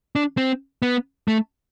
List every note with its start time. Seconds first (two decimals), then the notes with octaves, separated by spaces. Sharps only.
0.16 D4
0.37 C4
0.82 B3
1.28 A3